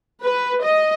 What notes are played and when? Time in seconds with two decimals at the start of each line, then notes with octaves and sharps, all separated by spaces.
0.22 B4
0.63 D#5